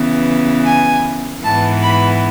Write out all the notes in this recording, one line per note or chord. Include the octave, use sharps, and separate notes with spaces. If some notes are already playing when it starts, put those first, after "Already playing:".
Already playing: C#3 E3 B3
G#5
G#2 E3 B3 A5
B5